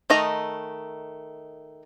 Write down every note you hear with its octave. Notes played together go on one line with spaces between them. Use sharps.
D#3 A3 D#5 A#5